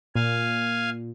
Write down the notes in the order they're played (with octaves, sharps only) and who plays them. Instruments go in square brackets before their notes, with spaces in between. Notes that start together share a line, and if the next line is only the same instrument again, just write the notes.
[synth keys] A#2 [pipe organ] F5 G#5